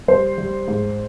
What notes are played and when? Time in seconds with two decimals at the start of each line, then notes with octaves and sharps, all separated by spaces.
0.08 G3 C5
0.38 G3
0.68 G#2